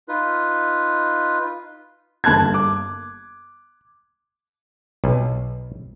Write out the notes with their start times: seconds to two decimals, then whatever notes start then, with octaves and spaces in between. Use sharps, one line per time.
0.09 D#4 F4 B4
2.24 G1 A#3 A5 F#6 G#6
2.54 D6
5.04 B1